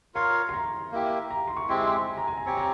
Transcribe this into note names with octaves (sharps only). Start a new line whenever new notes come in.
F4 A#4 C#5 F5 C6
C6
A#5
A#3 E4 G4
A#5
C6
C#6
G#3 C4 E4 G4 C6
C6
G#5
A#5
G#5
A#5
C4 G4 C#5 G#5
A#5